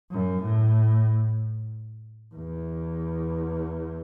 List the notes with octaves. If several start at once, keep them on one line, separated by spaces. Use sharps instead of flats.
F#2
A2
E2